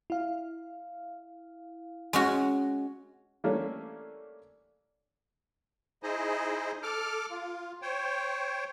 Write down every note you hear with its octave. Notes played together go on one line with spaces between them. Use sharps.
E4 F5
G#3 C#4 F#4
E3 G3 A3 A#3 C#4 D4
D#4 E4 G#4 C5 D#5
A4 D6 F6
F4
C5 C#5 G5